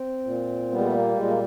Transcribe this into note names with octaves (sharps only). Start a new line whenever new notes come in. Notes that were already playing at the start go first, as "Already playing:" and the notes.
Already playing: C4
A#2
G3 B3
G#3
A3
A#3
A#2 G#3
A#3